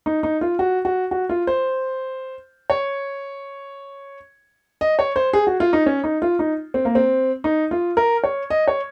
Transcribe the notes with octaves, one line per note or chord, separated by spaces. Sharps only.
D#4
D#4
F4
F#4
F#4
F#4
F4
C5
C#5
D#5
C#5
C5
G#4
F#4
F4
D#4
C#4
D#4
F4
D#4
C4
A#3
C4
D#4
F4
A#4
C#5
D#5
C#5